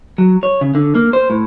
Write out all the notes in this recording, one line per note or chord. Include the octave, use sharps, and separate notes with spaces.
F#3
C#5
C#3
D3
A#3
C5
A2